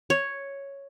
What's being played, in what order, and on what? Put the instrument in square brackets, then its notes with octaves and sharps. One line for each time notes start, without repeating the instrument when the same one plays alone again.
[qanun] C#5